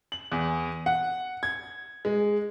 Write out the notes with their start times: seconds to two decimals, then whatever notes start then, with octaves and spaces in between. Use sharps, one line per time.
0.12 F#7
0.32 E2
0.86 F#5
1.43 G#6
2.05 G#3